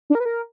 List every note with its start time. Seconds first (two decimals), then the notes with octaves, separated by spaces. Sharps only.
0.10 D4
0.15 A#4
0.20 B4
0.25 A#4